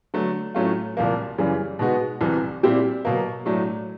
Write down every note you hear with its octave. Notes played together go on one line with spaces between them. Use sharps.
D3 F#3 A3
A2 F#3 A3 C#4 F4
C2 A#2 F3 A#3
F#2 C#3 E3 G3
B2 G#3 B3 D#4 F#4
C2 C3 E3
A#2 G3 C4 E4 G4
B2 F#3 A#3
A2 F#3 A3 D4